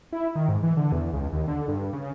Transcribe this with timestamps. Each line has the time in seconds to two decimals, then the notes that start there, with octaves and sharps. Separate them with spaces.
0.12 E4
0.35 D#3
0.48 G#2
0.63 E3
0.77 D3
0.92 E2
1.13 C#2
1.33 D#2
1.48 D3
1.68 G2
1.93 C#3